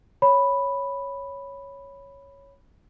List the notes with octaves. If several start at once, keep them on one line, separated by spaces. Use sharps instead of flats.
C#5 B5